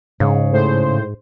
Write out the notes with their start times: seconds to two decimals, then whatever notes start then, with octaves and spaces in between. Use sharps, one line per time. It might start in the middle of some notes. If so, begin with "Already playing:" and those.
0.20 G#2 C#3
0.52 A2 C5